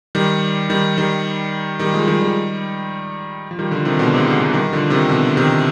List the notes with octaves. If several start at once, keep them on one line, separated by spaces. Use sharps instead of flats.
D#3 G3
D#3 G3
D#3 G3
D#3 G3
F3 G#3
D#3 G3
D#3 G3
F3
D#3 G3
D3 F3
C3 D#3
B2 D3
G#2 C3
G#2
G#2
D#3 G3
D3 F3
C3 D#3
B2 D3
C3 D#3